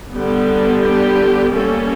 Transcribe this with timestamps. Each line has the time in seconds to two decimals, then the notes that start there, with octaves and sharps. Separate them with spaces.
0.12 D3 G3 B3
0.83 G4
1.53 G3 A#3 C#4 A4